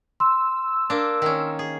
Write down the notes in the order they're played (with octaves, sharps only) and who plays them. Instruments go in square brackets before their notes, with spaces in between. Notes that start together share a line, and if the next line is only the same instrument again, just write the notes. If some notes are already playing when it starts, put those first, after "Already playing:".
[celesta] C6 [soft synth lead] E6
[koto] A#3 D4
D#3 C#4
G#4